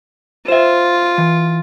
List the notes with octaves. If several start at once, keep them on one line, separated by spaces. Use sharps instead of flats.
F4 C5 E5
E3